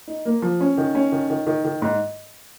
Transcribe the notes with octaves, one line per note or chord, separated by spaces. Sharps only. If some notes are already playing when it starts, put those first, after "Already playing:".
D#4
A#3
F3
C#4
D#3
C#4
D#3
D#3
D#3
D#3
G#2